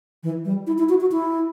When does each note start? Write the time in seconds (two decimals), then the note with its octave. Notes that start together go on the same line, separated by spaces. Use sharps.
0.23 E3
0.45 G3
0.67 E4
0.78 E4
0.89 F#4
1.00 F#4
1.12 E4